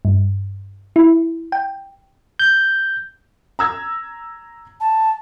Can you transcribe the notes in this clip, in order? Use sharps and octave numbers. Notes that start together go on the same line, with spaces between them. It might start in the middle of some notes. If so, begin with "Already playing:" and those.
G2
E4
G5
G6
A#5 E6 G#6
A5